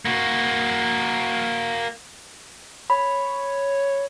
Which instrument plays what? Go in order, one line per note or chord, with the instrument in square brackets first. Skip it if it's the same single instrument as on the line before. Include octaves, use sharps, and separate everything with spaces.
[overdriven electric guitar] A#3 F#4
[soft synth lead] C#5 [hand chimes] B5